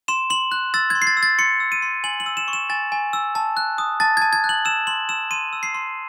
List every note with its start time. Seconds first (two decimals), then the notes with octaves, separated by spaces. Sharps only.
0.08 C6 E7
0.30 C6 F#7
0.52 F#6
0.74 E6 A6
0.90 G#6
0.95 C6
1.02 C7
1.07 A6
1.17 E6
1.23 A6
1.38 C6 C#7
1.60 E6
1.72 D#7
1.82 C6
2.04 G#5 F#7
2.20 F#7
2.26 E6
2.37 E7
2.48 C#6
2.53 E7
2.70 G#5 A6
2.92 G#5
3.13 E6
3.35 A5
3.57 F#6
3.78 D#6
4.00 A5 A6
4.17 A5 G#6
4.33 G#6
4.44 F#6
4.49 F#7
4.65 E6 E7
4.87 C6 F#7
5.09 E6 E7
5.31 C6 D#7
5.53 E6
5.63 C7
5.74 C6